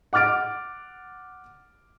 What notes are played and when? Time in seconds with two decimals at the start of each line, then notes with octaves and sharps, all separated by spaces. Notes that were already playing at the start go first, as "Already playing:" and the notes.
0.13 F#5 D6 F6 A6 D7